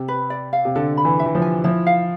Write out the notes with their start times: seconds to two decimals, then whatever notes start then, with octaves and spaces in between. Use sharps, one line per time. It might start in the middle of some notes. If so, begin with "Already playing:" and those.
Already playing: C3
0.08 B4
0.30 D5
0.53 F5
0.65 C3
0.75 D3 A4
0.97 B5
1.05 E3
1.19 E5
1.26 E3
1.35 F3
1.42 G#5
1.64 F3 E4
1.87 F5